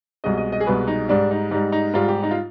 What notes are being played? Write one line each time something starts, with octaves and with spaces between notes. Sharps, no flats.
C2 B2 G#3 D#5
D#5
D#5
G#4
C2 B2 G#3 B4
D#4
G#2 G3 D4
D#4
G#2 G3 D#4
D#4
G#2 G3 F4
G4
D#4
F4